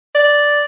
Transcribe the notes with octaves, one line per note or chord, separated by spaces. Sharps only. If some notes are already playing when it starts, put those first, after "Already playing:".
D5